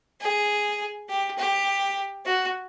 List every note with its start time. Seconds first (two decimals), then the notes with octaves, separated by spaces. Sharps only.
0.21 G#4
1.09 G4
1.38 G4
2.26 F#4